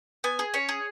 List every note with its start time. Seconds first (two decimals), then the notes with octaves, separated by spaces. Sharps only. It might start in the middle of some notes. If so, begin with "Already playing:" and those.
0.24 B3 G#5
0.39 G#4
0.54 C#4 C#5
0.69 G#4